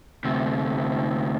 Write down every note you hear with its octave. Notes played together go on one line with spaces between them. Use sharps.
D2 C3